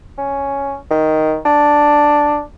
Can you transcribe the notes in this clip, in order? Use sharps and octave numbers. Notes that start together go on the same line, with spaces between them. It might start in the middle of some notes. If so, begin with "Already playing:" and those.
C#4
D#3
D4